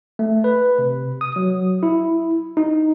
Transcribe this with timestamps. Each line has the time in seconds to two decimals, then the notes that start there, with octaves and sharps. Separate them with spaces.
0.19 A3
0.44 B4
0.79 C3
1.21 D#6
1.36 F#3
1.83 E4
2.57 D#4